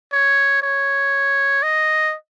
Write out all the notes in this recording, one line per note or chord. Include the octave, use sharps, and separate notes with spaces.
C#5
C#5
D#5